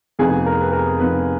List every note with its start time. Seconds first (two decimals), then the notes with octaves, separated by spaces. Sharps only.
0.19 F1 F2 F3 B3 D#4 G#4
0.46 A#4
0.61 B4
0.73 A#4
0.99 F1 F2 F3 B3 D#4 B4